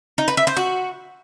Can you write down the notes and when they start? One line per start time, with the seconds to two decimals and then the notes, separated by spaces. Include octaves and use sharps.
0.18 D#4
0.28 B4
0.37 E5
0.47 C5
0.57 F#4